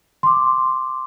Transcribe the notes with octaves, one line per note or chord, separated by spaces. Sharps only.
C6 D6